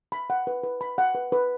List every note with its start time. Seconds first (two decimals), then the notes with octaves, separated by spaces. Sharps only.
0.12 B5
0.30 F#5
0.47 B4
0.64 B4
0.81 B5
0.98 F#5
1.15 B4
1.32 B4